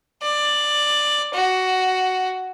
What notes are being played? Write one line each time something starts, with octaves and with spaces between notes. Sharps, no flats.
D5
F#4